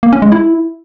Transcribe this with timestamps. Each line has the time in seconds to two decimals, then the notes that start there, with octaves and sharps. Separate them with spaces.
0.03 A#3
0.13 C#4
0.22 G#3
0.32 E4